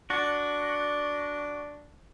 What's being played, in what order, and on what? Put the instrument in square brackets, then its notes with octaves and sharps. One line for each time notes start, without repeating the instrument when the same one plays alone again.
[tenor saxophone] D4 [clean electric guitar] F#4